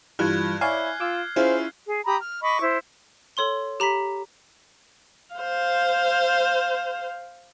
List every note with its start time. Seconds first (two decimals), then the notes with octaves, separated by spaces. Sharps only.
0.19 G2 E3 G3 F4 F#6 G#6
0.61 E4 C#5 D5 F5 G#5 F6 C7
1.00 F4 D6 E6
1.36 C#4 E4 F4 G#4 C5
1.86 G#4
2.05 G4 A#5 B5 D#6
2.21 F6
2.42 D#5 B5 C#6 D6
2.61 E4 C5
3.37 A4 C#5 C6 G7
3.80 G4 A#5 B5 B6
5.35 C5 F5